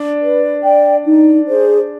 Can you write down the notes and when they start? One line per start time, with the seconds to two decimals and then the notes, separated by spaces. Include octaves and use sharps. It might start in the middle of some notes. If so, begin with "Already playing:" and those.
Already playing: D4
0.22 B4
0.63 D5 G5
1.05 D#4
1.46 G#4 C5